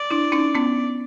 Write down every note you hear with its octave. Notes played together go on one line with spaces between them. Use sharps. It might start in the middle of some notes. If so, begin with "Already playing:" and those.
Already playing: D5
D4 E4
C#4 D#4
B3 C#4